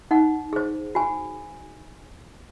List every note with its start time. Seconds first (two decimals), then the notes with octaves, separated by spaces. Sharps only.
0.11 D#4 F#5
0.53 G#4 C5
0.95 F#4 G#5